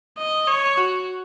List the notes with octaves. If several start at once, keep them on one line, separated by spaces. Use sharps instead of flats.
D#5
C#5
F#4